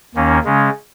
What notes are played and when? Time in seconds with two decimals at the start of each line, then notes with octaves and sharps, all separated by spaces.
0.15 D#2 D#3 A#3 C#4
0.45 C#3 G#3 C#4